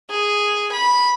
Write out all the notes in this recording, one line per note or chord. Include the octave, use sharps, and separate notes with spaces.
G#4
B5